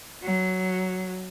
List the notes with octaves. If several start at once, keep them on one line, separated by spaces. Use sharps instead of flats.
F#3